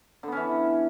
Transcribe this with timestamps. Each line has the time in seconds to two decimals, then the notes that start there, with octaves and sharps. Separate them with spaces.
0.23 D3
0.28 B3
0.32 C#4
0.37 E3